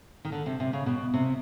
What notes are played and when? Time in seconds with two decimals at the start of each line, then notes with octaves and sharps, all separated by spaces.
0.25 D#3
0.32 D3
0.46 C3
0.60 C3
0.73 C#3
0.86 B2
1.14 C3